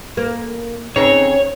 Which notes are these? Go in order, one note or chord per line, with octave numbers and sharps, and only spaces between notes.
A#3
C#3 C4 D#4 C#5